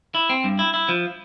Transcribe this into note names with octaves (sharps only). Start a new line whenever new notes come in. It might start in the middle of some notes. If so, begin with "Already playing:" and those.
E4
C4
G2
E4
E4
F3